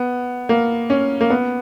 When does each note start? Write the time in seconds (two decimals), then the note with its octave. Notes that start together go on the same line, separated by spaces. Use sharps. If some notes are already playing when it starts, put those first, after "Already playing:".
Already playing: B3
0.49 A#3
0.90 C#4
1.21 A#3
1.30 B3